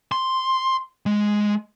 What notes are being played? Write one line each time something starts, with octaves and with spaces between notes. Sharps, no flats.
C6
G#3